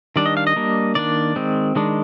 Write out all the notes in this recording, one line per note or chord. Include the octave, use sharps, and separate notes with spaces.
D#3 G3 D4 D5
D#5
F5
D#5
G3 A#3 D4
D#3 A#3 D4 D5
D#3 G#3 C4
D#3 G#3 D4